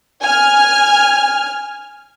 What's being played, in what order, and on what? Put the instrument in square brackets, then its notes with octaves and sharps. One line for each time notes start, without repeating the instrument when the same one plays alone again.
[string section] G#5 F6